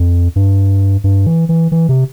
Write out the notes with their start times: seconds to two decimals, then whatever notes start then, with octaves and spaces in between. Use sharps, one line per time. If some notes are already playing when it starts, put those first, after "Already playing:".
Already playing: F2
0.36 G2
1.04 G2
1.27 E3
1.49 E3
1.72 E3
1.89 C3